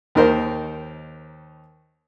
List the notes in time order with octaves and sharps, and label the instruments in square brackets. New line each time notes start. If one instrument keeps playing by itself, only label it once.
[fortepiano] D#2 D#3 A#4 C5